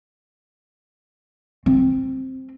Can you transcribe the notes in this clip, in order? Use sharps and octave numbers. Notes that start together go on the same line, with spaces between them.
C4